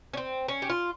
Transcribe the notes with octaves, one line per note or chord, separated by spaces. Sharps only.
C#4
C4
C#4
G4
F4